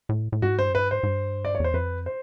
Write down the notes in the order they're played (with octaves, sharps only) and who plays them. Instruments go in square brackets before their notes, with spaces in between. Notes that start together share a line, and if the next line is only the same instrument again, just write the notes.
[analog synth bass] A2
A2
[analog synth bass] G#2 [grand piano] F#4
[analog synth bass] G2 [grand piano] C5
[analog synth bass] F#2
[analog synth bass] G2 [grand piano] B4
[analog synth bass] G#2 [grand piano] C5
[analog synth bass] G#2
G2
[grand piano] D5
C#5
[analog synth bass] E2 [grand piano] C5
[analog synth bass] F2 [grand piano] B4
[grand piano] C5